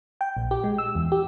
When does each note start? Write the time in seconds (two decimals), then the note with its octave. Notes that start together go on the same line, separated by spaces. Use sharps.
0.21 G5
0.37 A#1
0.51 G4
0.64 G#3
0.78 E6
0.95 E2
1.12 G4